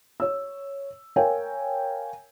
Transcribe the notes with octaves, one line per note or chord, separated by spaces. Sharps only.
C#5 E6
A#4 C#5 F5 G5 G#5